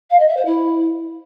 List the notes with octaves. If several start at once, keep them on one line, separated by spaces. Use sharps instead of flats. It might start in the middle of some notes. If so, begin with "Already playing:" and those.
F5
D#5
E5
C5
E4